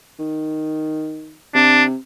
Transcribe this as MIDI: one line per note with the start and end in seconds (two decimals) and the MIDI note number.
0.19 1.37 51
1.55 1.96 48
1.55 1.84 62